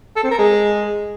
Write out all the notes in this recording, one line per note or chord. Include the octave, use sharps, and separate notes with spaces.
A4
C4
A#4
G#3